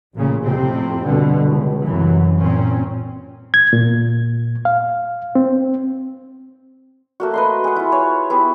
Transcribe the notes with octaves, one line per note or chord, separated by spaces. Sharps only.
A1 A#2 C#3
F2 A2 C3 C4
G2 B2 D3
C#2
C2 F#2 E3
A#2 C4 C#4
G#6
A#2
F5
C4
A3 A#3 F#4
B4 D#5 C6
G#4 F#5
E4 F4
C#5
B3 E4 G4 G#4